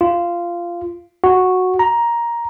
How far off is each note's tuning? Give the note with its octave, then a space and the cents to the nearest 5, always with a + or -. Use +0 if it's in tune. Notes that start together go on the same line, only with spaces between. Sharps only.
F4 -10
F#4 -5
A#5 +10